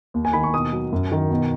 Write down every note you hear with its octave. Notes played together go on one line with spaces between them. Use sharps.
D#2
G#5
D#3 B5
C#6
B2 D#6
F#3
F#2
D#3
B2